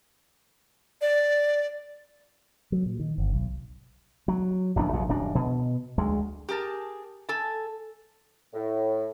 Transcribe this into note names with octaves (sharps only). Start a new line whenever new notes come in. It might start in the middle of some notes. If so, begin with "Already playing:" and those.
D5
F#3
A#2
D#3
G1
B1
F#3
D1 A#1 F2 D4
A#1 D#2 A#2 F#3
D#1 F#2 D4
B2
D2 G#3
G4 G#4 A#4 A5
A4 G#5 A5
A2